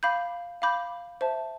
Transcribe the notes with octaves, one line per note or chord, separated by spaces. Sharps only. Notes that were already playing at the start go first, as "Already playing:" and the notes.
F5 B5 D6 G6
F5 B5 D6 G6
C5 E5 A5